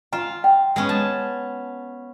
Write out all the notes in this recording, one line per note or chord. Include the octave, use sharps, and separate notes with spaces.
F4 G#5 A#5
G5
G#3 B3 C#4
A5